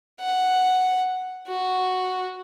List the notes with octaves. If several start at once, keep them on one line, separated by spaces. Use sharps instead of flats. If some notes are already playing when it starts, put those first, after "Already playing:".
F#5
F#4